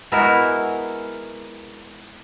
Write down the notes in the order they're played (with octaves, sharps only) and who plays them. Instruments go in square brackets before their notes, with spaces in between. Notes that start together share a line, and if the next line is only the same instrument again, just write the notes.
[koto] G#3 B3 E4 F#4 A#4